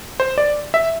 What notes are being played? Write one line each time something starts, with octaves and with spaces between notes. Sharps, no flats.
C5
D5
E5